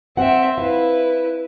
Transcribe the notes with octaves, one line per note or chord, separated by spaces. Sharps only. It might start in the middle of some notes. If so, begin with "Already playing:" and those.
C4 E5 F#5
E4 B4 F5